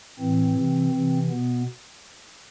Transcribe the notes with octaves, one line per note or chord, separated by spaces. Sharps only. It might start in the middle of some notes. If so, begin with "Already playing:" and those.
A2 E3 C4
C3 E3
C3 E3
B2 B3